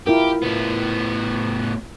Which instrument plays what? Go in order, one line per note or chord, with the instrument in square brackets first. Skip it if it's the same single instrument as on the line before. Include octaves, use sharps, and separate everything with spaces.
[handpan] E4 F4 A#4 [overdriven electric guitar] G4
[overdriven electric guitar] A2 B3